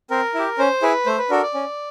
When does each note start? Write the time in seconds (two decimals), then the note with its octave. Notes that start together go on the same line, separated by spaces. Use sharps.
0.10 C4 A#4
0.35 E4 G4
0.58 C#4 C5
0.82 E4 G#4 B4
1.06 A3 C5
1.18 B4
1.30 D4 F#4 A4 A#4
1.42 D5
1.54 C#4